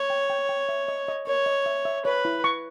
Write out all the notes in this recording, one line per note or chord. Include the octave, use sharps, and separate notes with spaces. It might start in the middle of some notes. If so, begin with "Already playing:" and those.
Already playing: C#5
G5
G5
G5
E5
D#5
D#5
A#4 C#5
D#5
E5
E5
B4 C#5
E4
C#6